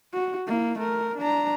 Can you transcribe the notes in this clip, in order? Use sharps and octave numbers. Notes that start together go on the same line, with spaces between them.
F#4
A#3 E4
A3 A#4
D4 A#5